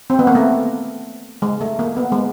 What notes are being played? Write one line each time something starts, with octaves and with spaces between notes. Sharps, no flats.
C4
B3
A#3
A3
G#3
A3
A#3
B3
G#3